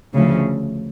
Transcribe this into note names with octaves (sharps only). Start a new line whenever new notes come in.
D2 C#3 F3 A3